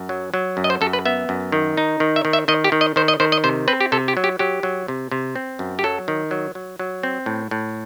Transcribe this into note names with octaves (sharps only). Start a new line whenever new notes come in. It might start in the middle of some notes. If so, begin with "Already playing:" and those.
Already playing: F#2
F#3
F#3
F#2
D#5
C5
F#2 A4
B4
B3 E5
F#2
D#3
D#4
D#3
E5
D#3
E5
D#3 D#5
G4
D#3
D#5
D#3 C5
D#5
D#3 C5
D#5
C3 C5
C4 B4
G4
C3 A4
G4
F#3
G4
F#3 G4
F#3
C3
C3
C4
F#2
G4
F#3 A4
D#3
F#3
F#3
F#3
C4
A2
A2